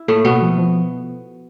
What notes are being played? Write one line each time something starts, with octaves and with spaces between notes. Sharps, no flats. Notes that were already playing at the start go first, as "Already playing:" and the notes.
Already playing: E4
A2 A3 A#3
B2 A#3 B3
F3
F3